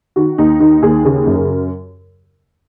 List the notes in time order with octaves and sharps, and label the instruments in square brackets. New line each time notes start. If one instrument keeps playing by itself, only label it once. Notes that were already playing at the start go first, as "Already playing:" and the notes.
[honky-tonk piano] D#3 F#4
D#2 D#4
D#3 D#4
D#2 G#4
C#3 G#4
F#2
A#4